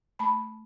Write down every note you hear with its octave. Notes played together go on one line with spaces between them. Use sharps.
A3 A5 B5